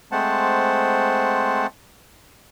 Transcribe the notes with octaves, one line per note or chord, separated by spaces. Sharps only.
G#3 A3 C4 C5 F#5 A5